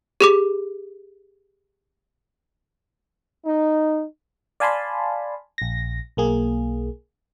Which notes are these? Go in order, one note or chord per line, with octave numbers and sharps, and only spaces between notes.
G4 G#4 D6
D#4
D5 F5 G#5 A5 B5 C6
A#1 A#6
B1 A#3 G#4